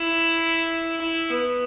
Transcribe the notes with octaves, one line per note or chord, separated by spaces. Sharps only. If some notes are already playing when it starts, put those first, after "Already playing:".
Already playing: E4
E4
B3